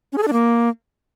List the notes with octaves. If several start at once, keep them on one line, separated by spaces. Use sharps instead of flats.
C#4
G#4
A4
D4
A#3